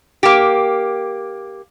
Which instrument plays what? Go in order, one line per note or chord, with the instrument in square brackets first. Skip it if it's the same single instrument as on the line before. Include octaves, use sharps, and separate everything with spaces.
[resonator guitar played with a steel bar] A#3 G4